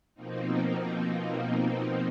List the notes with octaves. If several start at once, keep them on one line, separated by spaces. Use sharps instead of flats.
B2 F3 A#3 C4 D#4